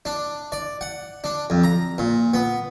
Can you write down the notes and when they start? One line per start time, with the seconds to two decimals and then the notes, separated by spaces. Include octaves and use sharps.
0.05 D4
0.52 D5
0.81 F#5
1.24 D4
1.50 F2
1.64 A#5
1.98 A#2
2.34 B3